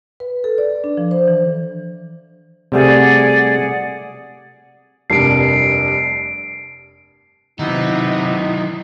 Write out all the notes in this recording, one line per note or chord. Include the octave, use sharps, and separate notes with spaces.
B4
A4
D5
D4
F3
C5
E3
C3 G3 A3 G#4 D5 F#5
F1 G2 A#4 C7 D7
C3 D#3 F#3 B3 C4 D#4 E4